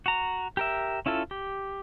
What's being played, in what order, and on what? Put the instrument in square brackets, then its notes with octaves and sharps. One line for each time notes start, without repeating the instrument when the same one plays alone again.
[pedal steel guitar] F#4 A#5
G4 A#4 E5
C#4 E4 F4 A4
G4